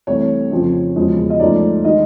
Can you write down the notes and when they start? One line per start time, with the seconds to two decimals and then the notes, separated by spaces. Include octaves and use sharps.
0.07 C2 C3 E3 A3 C#5
0.51 F2 C#3 F3
0.96 E1 E2 C#3 F3 G#3
1.30 D#5
1.40 G#2 F3 A3 C#4 D5
1.84 D#3 G#3 D#5